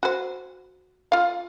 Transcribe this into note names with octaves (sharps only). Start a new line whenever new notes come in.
F#4 C5
F4 F5